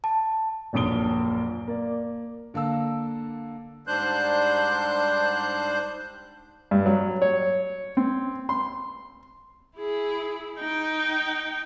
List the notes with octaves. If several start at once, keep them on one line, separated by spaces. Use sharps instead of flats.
A5
D#1 A#1 F#2 D#6 D7 G7
A#3 D5
D3 A#3 A4 E6
G#2 G3 D4 C5 F#6 G6
G2
F#3
C#5
C4
C6
E4 G#4
D#4 G5